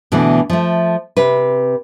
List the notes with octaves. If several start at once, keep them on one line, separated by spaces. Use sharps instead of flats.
B2 D3 E3 A3
F3 A3
C3 B4